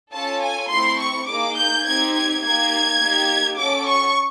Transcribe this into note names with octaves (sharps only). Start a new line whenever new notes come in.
C#4 F4 A4 A5
G#5
A3 C4 E4 C6
C#6
A#3 D#4 G#4 D6
G6
C4 D#4 G4 G#6
G#6
A#3 D#4 G4 G#6
A#3 D#4 G4
C#4 F#4 A4 D6
C#6